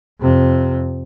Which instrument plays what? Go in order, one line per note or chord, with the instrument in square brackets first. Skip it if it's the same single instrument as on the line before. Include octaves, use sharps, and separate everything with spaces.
[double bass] F2 C3